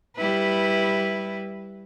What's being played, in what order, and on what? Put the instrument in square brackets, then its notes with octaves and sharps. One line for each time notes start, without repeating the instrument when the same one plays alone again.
[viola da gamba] G3 E4 B4